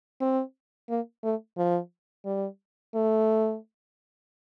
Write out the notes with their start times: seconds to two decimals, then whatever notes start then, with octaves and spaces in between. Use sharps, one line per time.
0.21 C4
0.89 A#3
1.24 A3
1.57 F3
2.25 G3
2.95 A3